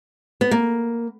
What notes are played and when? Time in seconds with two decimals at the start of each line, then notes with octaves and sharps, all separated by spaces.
0.41 B3
0.51 A#3